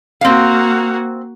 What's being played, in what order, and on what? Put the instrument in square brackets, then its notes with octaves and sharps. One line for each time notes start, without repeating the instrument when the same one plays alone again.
[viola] A#3 F#4 [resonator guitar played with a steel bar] C4 F5